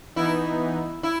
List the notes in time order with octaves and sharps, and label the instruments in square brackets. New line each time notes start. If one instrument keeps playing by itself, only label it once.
[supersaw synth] E3 B3 D#4 [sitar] E4
[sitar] E4